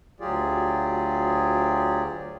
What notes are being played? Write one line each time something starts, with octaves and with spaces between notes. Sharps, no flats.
D2 F#3 F4 G4 G#4 D5